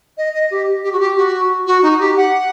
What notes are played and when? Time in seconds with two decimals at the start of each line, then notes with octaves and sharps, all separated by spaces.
0.18 D#5
0.35 D#5
0.51 G4
0.83 G4
0.93 F#4
1.00 G4
1.17 F#4
1.67 F#4
1.83 D#4
2.00 G4
2.17 F#5